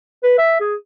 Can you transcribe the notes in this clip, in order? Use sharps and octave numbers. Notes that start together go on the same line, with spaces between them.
B4
E5
G#4